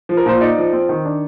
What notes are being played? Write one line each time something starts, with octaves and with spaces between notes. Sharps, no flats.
F3
A#4
A#2 C5
D#4 D5
F3
C4
D#3
D4